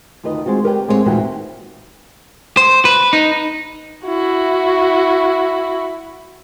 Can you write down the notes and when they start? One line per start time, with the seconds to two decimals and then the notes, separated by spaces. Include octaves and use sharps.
0.24 D2 D#3 F4 B4 D#5
0.46 G#3 C4 F4 F#4
0.64 G4 A#4 B4 D5 F5 G5
0.88 A2 G#3 C4 G#4 C#5 F#5
1.05 D#2 A#2 E3 F#4 F#5 G5
2.57 C5
2.85 B4
3.13 D#4
4.06 E4 F#4